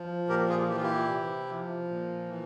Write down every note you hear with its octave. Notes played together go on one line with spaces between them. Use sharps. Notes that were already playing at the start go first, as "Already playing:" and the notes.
Already playing: F3
A#2 G4 A#4
F4 G#4
E3 G4
F4
E4 G4
C3
F3
A#2
E3